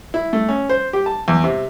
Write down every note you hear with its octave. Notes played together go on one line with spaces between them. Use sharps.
E4
A3
C#4
C5
G4
A5
E2
C3